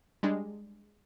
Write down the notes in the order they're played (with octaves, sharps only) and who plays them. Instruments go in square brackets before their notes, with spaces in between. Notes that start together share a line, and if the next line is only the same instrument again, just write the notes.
[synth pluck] G3 G#3 D4